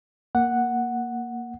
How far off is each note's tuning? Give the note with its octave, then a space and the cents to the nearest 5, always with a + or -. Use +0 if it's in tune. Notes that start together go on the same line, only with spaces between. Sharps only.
A#3 +0 F#5 +0